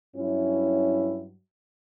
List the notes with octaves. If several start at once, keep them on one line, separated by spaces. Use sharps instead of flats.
G2 F#3 C#4 E4